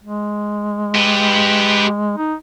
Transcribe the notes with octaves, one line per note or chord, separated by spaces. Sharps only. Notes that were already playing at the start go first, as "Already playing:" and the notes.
G#3
G4 B4
D#4